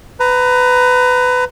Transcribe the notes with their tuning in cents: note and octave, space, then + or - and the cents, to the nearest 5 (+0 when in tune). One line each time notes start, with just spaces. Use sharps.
B4 +20 A#5 +0